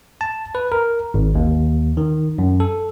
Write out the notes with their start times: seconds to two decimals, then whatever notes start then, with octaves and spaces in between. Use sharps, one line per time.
0.21 A5
0.55 B4
0.72 A#4
1.14 G#1
1.35 D#2
1.97 D#3
2.38 F#2
2.60 A4